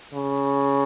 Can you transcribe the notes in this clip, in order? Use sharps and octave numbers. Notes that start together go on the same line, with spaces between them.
C#3